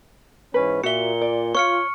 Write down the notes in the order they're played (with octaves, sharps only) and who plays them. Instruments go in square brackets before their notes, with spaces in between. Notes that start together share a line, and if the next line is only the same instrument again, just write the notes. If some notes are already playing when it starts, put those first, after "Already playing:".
[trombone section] G#2 E3 C#4 [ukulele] B4
[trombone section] A#2 [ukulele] F#4 E5 [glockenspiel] C#7 G7
[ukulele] D5
[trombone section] F4 [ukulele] C#5 [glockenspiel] C#6 F6 C#7